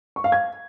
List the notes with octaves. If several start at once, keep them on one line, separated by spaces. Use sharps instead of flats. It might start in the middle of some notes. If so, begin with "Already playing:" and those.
C#6
F5
G#6